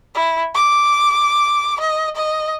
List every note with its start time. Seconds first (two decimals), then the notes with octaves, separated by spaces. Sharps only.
0.15 E4
0.55 D6
1.80 D#5
2.16 D#5